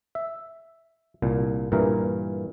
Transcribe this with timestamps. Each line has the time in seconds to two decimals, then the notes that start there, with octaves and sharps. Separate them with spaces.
0.15 E5
1.22 C2 A#2
1.72 G2 A#2 E3 A#4